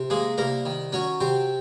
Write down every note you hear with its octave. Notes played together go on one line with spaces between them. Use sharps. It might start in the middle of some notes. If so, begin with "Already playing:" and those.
Already playing: C3
G#3 A#3 G#4
C2 A#3 A#4
D#3
F#3 C#4 C#5
C3 C4 C5